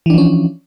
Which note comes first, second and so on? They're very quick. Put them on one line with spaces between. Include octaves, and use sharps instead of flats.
E3 D4 F3 C#4